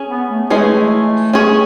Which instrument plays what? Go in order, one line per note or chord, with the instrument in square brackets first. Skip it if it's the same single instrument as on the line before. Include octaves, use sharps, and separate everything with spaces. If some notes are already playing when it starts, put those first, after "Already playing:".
Already playing: [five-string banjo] C#4 G#4
[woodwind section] B3
A3
[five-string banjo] E3 G#3 C#4 G#4
C#4 G#4 C#5